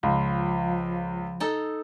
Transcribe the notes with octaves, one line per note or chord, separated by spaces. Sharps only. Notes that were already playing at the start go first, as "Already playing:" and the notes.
C#2 F3 F5 B5 C6
D#4 A4